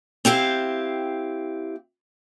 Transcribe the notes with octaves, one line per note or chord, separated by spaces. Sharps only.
C4 E4 G4 F5